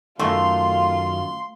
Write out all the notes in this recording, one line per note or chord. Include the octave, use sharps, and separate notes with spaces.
F#2 D#3 A3 F4 C6